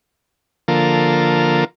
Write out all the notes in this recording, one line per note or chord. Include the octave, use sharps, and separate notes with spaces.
D3 F3 A#3 F4 A4 A#4